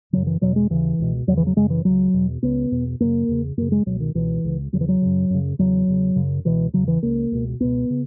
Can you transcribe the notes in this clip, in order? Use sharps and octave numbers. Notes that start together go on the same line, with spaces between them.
F#2 C#3 F#3
E3
E2 B2 F#3
G#3
D#2 C#3 E3
C#2 B2
E2 C#3 F#3
E3
F#3
F#2 C#3 G#3
E3
C#2 C#3 F#3
E2 B2
C#2 C#3 B3
E2 B2
F#2 C#3 A#3
E2 C#3
F#2 C#3 A#3
G#3
C#2 B2 F#3
D#3
C#2 B2 E3
C#2 C#3
E2 C#3 F#3
E3
F#3
F#2 C#3
F#2 C#3
E2 C#3 F#3
E2 C#3
F#2 C#3
C#2 B2 E3
E2 C#3 F#3
E3
C#2 C#3 A#3
C#2 B2
C#2 B2 B3
C#3